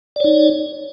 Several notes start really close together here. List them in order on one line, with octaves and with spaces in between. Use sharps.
D5 C#5 D#4